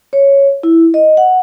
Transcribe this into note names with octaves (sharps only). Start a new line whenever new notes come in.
C#5
E4
D#5
F#5